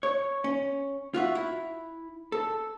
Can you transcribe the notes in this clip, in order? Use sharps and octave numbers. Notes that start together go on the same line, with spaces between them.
C#5
C#4
F4 F#4 E5
E4
A4